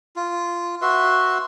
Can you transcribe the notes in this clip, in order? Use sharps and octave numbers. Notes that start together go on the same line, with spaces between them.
F4
F#4 B4 E5 C6